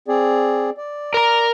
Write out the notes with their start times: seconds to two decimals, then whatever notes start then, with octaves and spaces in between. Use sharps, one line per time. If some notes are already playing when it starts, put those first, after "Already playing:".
0.08 C4 G#4 D5
0.77 D5
1.14 A#4 A#5